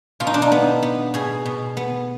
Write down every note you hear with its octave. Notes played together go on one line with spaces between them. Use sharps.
B2 F4
D#4
D4
D#4
B3
B3
B2 G#4
B2
B3